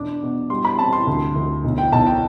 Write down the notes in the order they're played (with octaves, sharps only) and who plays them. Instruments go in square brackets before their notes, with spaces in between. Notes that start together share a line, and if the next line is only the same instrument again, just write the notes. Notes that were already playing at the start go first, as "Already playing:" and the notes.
Already playing: [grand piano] E1 D4 D6
B2
G3 C6
B5
C4 A5
C6
D2
D2
B1
G5
B1 A5
G5